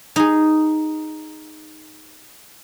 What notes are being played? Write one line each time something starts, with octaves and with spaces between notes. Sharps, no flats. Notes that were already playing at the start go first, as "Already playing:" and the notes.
D#4 G#4